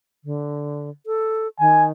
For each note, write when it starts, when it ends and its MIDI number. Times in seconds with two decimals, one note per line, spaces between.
0.24 0.90 50
1.06 1.47 69
1.59 1.91 51
1.59 1.85 80